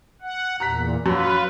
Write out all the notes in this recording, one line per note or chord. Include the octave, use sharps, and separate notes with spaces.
F#5
E2 A#2 A#5 F#6 B6
F#2 F4 B4